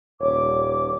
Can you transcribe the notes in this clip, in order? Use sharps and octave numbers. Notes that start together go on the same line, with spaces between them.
D#1 C#5 D6